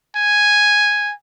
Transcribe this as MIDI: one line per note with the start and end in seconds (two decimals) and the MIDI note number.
0.16 1.12 80